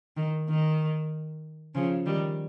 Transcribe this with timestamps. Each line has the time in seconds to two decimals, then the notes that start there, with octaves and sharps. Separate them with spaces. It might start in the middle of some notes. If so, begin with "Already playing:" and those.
0.17 D#3
0.49 D#3
1.74 C#3 F3
2.06 D#3 G3